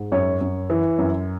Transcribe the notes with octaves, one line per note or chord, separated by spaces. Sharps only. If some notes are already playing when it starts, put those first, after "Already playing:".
Already playing: G#2
F#2 C#5
F#2
E3
F#2